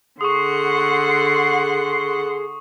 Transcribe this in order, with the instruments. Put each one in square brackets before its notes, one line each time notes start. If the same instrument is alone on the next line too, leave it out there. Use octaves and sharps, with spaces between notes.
[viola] D3 F#5 [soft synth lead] G#4 [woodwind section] C6 [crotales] C#6 D#6